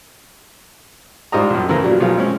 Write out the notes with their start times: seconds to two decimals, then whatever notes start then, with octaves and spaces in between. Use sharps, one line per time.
1.32 G#2 G3 F4 C5 D#5 A#5
1.50 A#1 F#2
1.69 C#3 E3 F3 A3 A#4
1.83 A#2 F#3 G3
2.00 B1 B2 F3 F#3 F4 G#4
2.17 G#3 C4 C#4